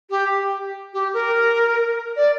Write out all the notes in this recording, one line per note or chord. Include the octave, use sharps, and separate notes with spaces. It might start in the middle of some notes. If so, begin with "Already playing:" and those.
G4
G4
A#4
D5